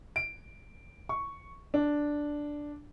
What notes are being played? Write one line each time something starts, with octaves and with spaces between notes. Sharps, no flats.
D7
C#6
D4